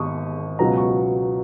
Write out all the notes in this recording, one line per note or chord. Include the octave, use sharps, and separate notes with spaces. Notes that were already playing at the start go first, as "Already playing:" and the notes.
Already playing: G#1 C#6 D#6
C#2 B2 F#3 B3 A#5
C#6